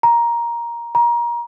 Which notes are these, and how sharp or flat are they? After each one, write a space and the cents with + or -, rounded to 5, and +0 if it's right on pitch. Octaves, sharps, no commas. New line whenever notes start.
A#5 +10
A#5 +25